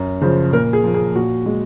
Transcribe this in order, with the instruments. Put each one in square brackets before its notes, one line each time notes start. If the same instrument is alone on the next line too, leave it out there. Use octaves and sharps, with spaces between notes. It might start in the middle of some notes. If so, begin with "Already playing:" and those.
Already playing: [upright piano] F#2
C#3 F3 C5
A#2 A#4
G#4
F3 A#3
G#4
A#2 F#4
G#3